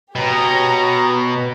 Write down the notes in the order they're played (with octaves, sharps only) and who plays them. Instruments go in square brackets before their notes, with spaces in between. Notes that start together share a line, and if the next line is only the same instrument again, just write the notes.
[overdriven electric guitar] B2 [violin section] G4 C#5 A#5